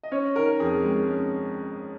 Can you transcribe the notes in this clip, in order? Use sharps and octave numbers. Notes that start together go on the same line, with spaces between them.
D#5
C#4 C#5
D#3 A#4
F2 G#4
G#3
C#4